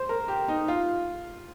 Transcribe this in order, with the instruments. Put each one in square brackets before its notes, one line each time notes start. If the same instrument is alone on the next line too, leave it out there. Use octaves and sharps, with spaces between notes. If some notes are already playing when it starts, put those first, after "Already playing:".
Already playing: [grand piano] C5
A#4
G4
D#4
F4